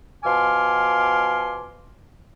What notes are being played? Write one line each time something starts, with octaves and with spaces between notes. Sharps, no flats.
B2 F3 G#5 C6 D6 F6